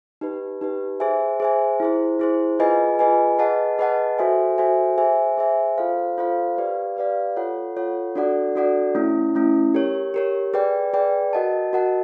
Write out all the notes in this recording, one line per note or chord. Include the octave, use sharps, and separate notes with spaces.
D#4 G4 B4
D#4 G4 B4
G#4 C5 E5 G#5
G#4 C5 E5 G#5
E4 G#4 C5
E4 G#4 C5
F4 G#4 B4 D#5 G#5
F4 G#4 B4 D#5 G#5
G#4 B4 D#5 F#5 A5
G#4 B4 D#5 F#5 A5
F#4 A4 C5 E5 G#5
F#4 A4 C5 E5 G#5
G#4 C5 E5 G#5
G#4 C5 E5 G#5
F4 A4 C5 F5
F4 A4 C5 F5
G4 B4 D5 F5
G4 B4 D5 F5
F4 A4 C#5 F#5
F4 A4 C#5 F#5
D4 F#4 A4 D5 F#5
D4 F#4 A4 D5 F#5
A3 C#4 E4
A3 C#4 E4
G4 A#4 C#5
G4 A#4 C#5
G#4 B4 D5 G5
G#4 B4 D5 G5
F#4 A#4 D#5 F#5 A5
F#4 A#4 D#5 F#5 A5